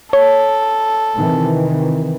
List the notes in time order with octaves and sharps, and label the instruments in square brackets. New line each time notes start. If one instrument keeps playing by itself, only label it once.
[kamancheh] A4 [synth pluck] C#5
[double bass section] C3 D#3 E3